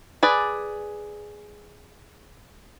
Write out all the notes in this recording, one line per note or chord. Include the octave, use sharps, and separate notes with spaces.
G#4 B4 D5